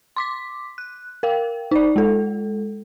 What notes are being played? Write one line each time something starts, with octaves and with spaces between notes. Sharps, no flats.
C6 D6 B6
F#6
A#4 F5 G5
D#4 D5
G#3 A4